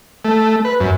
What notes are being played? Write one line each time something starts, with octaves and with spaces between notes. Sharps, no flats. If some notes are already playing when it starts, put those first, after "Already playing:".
A3
B4
F#2